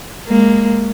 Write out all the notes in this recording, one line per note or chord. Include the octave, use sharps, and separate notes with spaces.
G#3 A#3